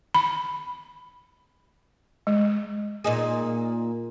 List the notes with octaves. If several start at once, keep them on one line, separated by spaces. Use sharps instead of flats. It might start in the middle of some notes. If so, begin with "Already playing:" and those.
B5
G#3
A#2 D#4 G#4